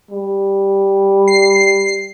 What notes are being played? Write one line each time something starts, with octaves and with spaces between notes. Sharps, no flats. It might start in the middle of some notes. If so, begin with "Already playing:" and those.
G3
C7